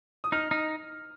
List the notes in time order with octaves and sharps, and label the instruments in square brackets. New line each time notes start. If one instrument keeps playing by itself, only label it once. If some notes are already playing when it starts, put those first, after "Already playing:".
[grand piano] D#6
[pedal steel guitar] D#4 [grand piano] F6
[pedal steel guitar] D#4